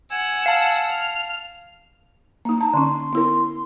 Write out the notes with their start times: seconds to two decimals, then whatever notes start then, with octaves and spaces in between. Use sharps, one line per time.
0.11 F#5 G#5 E6
0.46 F5 A5
0.91 F6
2.45 A#3 D#4
2.61 A5 A#5
2.74 D3 C#4 C6
3.13 B3 E4 A#4